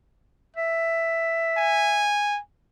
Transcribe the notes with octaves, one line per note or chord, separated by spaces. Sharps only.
E5
G#5